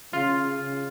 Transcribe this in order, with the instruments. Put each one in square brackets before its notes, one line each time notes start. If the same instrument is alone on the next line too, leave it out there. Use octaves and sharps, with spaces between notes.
[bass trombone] C#3 [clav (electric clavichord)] F4